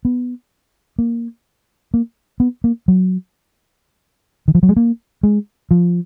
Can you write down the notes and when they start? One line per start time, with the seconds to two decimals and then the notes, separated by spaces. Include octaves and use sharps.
0.05 B3
0.99 A#3
1.94 A#3
2.40 B3
2.64 A#3
2.88 F#3
4.48 D#3
4.55 F3
4.63 F#3
4.69 G#3
4.76 A#3
5.23 G#3
5.71 F3